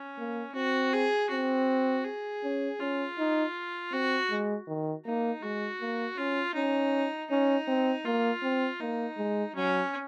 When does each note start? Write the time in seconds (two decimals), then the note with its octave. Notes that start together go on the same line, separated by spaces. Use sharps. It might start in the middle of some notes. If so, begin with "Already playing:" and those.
Already playing: C#4
0.18 A#3
0.55 C4 F#4
0.93 G#4
1.30 C4 F#4
2.05 G#4
2.43 C#4
2.80 C#4 F4
3.18 D#4
3.92 C4 F#4
4.30 G#3
4.68 D#3
5.05 A#3 D#4
5.42 G#3 F#4
5.81 A#3
6.17 C#4 F4
6.54 C#4 D#4
7.30 C#4 D#4
7.67 C4
8.05 A#3 F4
8.42 C4
8.80 A#3 D#4
9.17 G#3
9.55 F#3 C#4